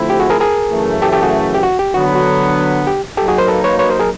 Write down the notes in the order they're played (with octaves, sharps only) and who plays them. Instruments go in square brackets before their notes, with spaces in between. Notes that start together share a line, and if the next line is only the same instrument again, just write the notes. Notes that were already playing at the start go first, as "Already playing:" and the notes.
Already playing: [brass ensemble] D3 F3 A3 C4 E4
[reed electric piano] G4
F#4 G#4
G#4 A#4
G#4 A#4
[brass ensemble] F#2 C#3 E3 A3
[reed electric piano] G4 A4
G4 A4
F#4 G#4
G4
F#4
G4
[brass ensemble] D3 F#3 B3 [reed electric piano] F#4
[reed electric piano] F#4
G4
[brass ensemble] F#3 A#3 D#4 [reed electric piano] G4 A4
[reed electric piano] F#4 G#4
A#4 C5
A4 B4
B4 C#5
B4 C#5
A#4 C5
G#4 A#4